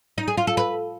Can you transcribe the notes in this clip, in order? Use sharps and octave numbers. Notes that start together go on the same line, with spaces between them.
D#4
G#4
F4
A4
B4